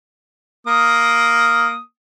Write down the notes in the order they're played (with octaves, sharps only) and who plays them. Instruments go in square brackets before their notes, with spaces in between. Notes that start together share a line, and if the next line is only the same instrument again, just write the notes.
[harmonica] A#3 D#6